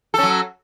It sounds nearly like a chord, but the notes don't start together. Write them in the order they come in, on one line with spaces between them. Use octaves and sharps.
A4 C#4 F#3